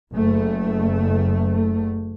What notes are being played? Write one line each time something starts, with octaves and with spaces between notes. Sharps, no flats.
F#1 A3